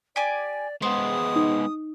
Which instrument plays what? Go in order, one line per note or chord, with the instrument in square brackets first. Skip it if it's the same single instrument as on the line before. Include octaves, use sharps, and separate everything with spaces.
[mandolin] G4 G#5 D6 [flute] D5
[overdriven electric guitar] G#3 B3 [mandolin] C5 [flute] D#6
[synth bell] D#4